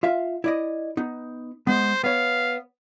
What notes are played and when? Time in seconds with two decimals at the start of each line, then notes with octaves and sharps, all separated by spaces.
0.03 F4 E5 F5
0.44 E4 D5 D#5
0.97 B3 D#4
1.67 G#3 B3 C5
2.04 B3 C#5 F5